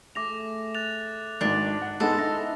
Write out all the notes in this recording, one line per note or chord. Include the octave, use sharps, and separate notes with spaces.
A3 G#4 D6 A#6 F7
F#6 A6 F7
G#1 G#2 D4
F#5
G#3 B3 D#4 A4 C5
D#4 E4 A#6